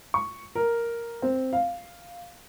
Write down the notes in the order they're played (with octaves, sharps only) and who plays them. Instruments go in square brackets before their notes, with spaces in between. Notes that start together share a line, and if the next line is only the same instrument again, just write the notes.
[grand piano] C#6
A#4
C4
F5